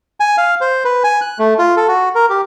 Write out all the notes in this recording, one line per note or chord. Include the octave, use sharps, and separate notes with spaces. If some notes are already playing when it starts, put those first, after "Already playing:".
G#5
F5
C5
B4
G#5
F#6
A3
F4
A4
F#4
A#4
G4